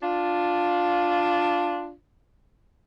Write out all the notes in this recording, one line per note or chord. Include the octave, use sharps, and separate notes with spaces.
D4 F4